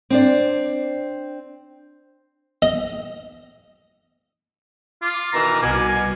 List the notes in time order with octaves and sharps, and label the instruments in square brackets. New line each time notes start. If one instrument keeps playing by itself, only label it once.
[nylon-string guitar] C4 D4 D5
[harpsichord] D#5
[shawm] F4 [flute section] D6 F6
[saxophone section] B2 D#3 E3 [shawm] A#5
[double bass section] C2 [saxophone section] B2 [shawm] G#5